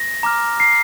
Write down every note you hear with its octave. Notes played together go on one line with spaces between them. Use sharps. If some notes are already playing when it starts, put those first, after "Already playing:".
Already playing: A#6
A#5 D6 F6
C7